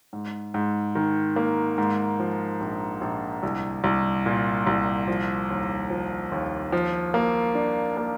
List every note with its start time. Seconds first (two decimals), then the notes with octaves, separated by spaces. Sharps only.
0.13 G#2
0.54 G#2
0.95 D#3
1.36 A#3
1.78 G#2
2.19 F3
2.60 A#1
3.01 A#1
3.43 C2
3.84 C2
4.26 A#2
4.67 C2
5.07 F3
5.50 D#2
5.90 F3
6.32 D#2
6.72 F3
7.14 A#3
7.55 D4
7.97 A#3